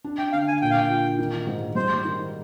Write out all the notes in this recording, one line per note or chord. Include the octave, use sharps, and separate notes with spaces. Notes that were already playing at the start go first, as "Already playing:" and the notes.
D4
G5
D3 F5
G#5
A#2 G5
F5
G5
F4
D#3
G#2
G3 C5
D#3